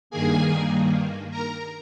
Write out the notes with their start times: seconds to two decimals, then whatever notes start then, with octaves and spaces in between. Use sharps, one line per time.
0.10 G2 D#3 A#3 G#4 G#5
1.31 A#4 A#5